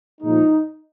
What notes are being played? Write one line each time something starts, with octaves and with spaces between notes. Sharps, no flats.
A#2 F3 G#3 D#4